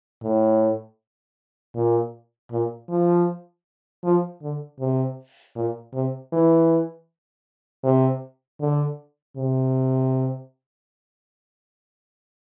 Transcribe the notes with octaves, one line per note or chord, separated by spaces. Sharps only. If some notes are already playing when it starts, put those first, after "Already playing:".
A2
A#2
A#2
F3
F3
D3
C3
A#2
C3
E3
C3
D3
C3